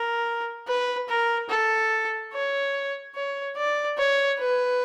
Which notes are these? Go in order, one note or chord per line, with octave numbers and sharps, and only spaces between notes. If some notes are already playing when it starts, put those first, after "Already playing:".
Already playing: A#4
B4
A#4
A4
C#5
C#5
D5
C#5
B4